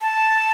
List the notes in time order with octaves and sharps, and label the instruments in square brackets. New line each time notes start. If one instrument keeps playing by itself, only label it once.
[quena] A5